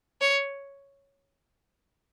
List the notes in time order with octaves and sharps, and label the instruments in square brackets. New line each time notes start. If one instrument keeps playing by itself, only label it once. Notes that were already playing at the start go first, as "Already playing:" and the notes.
[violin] C#5